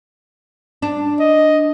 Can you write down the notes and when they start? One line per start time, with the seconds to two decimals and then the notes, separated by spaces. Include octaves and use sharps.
0.82 D4
1.20 D#5